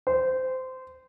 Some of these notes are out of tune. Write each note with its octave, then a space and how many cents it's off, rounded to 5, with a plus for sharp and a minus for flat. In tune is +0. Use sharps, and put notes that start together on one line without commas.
C5 -20